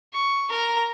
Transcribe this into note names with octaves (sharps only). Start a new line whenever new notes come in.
C#6
A#4 A#5